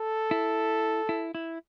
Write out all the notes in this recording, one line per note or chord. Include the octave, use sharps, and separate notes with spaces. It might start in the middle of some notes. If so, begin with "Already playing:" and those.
Already playing: A4
E4
E4
E4